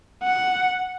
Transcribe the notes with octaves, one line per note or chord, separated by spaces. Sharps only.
F#5